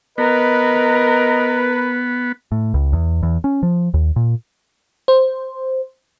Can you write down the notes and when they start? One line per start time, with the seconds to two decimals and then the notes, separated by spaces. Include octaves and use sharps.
0.18 B3 A#4 B4 D#5
2.52 A2
2.74 C#2
2.93 E2
3.23 E2
3.44 C#4
3.63 F3
3.94 D#2
4.16 A#2
5.08 C5